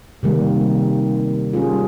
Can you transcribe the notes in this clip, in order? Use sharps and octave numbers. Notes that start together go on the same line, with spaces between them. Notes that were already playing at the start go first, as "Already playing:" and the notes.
C3 D#3 G3 A#3
G3 C#4 F4 G#4